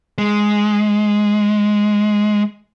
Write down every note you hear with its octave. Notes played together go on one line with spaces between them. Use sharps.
G#3